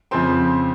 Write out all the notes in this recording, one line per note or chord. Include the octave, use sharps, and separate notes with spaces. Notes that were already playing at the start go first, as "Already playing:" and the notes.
F2 C#3 F3 C4 C6